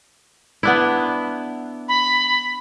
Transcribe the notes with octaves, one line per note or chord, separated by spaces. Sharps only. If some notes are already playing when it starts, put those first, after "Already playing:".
B3 D4 E4
B5